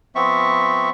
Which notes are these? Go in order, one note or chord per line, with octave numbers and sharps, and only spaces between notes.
F3 B3 C4 E5 C#6